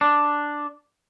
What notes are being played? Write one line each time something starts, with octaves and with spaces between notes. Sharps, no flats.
D4